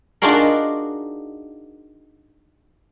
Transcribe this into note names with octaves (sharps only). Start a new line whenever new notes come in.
D4 D#4 F4 F#4 G#4 A#4